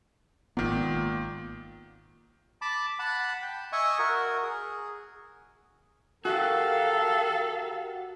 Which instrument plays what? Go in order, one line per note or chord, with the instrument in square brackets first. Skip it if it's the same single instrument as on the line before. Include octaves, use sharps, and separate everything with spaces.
[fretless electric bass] G#1 B3 [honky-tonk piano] A#2 D#3
[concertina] A5 B5 D6
F#5 A5 B5
G5
D#5 E5 G#5 C#6 D#6
F#4 A#4
G#4
[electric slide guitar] F#4 G4 [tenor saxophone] A4 [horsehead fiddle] A#4 F5